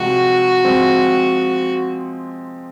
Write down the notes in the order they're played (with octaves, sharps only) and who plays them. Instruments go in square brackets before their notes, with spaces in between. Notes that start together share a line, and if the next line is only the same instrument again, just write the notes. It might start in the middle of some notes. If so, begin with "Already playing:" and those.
Already playing: [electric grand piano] C3 F3 G#3 [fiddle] F#4
[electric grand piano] F3 G#3 C4